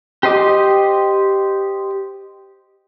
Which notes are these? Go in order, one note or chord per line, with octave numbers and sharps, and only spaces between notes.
G4 C5 D#5 D6